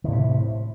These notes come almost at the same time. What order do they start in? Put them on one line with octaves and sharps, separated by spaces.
D#3 A2 C3